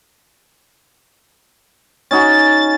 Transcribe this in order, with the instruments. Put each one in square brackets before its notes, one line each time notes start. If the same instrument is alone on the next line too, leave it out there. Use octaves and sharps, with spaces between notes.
[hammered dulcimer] C#4 D#4 F#4 [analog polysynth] A6